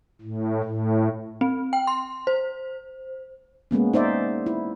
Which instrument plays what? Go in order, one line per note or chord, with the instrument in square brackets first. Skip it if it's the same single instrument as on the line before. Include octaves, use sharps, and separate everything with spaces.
[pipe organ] A2
A2
[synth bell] C4
G5
C6
C5
[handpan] G#3 A#3 B3 C#4
D#4 C5 D5 E5
E4